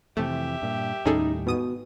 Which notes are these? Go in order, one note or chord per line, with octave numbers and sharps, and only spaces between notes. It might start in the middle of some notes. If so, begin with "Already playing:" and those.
F2 C3 E3 A3 G4 E5
G2 A#2
D#2 A2 G3 C#4 D#4 G#4 A4
G#2 B2 D#6 D#7